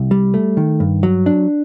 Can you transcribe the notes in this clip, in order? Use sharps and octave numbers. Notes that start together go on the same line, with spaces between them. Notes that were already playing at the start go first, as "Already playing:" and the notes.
Already playing: C2
G3
A3
D#3
G2
F#3
D4